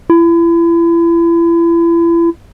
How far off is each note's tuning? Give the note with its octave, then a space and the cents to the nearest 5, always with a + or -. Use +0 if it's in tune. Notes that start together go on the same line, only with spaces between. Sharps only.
E4 +35